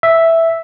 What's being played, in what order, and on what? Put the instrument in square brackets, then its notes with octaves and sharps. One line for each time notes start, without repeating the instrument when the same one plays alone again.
[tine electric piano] E5